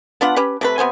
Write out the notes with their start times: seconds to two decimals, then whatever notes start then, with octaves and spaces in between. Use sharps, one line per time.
0.21 B3 D4 F4 F#5
0.36 C#4 G4 B4
0.61 C3 A3 B4
0.78 C3 B3 C5 G#5